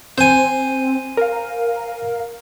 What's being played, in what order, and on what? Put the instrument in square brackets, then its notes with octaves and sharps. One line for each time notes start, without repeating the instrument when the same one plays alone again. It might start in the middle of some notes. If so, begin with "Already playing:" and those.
[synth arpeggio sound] C4 [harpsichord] C5 G#5
[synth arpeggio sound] A#4 F5